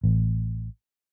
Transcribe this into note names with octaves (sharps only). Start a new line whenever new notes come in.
A1